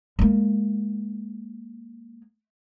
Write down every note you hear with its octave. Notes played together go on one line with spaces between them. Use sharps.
G#3 A#3